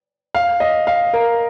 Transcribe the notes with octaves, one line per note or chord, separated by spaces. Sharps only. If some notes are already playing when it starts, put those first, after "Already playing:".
F5
D#5
F5
A#4